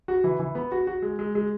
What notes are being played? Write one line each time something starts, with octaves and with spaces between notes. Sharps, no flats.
F#4
E3
E3
B3
F#4
F#4
G#3
G#3
G#3